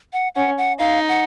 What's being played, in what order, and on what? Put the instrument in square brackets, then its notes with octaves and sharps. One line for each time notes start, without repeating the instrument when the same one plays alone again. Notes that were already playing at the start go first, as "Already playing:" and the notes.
[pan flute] F#5
[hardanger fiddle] C#4 [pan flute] F#5
[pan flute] F#5
[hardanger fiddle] D#4 [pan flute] F5
[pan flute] F#5